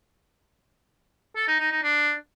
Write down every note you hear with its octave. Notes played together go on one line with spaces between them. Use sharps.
A4
D#4
D#4
D#4
D4